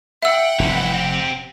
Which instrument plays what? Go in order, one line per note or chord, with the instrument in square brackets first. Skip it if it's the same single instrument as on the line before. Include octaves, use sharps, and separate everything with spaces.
[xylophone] E5 E6 [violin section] F#5 G5
[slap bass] F1 [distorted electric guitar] C2 E3
[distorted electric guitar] C4 G4